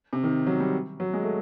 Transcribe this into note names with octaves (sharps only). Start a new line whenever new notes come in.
C3
D#3
F#3
G3
F#3
G#3
A3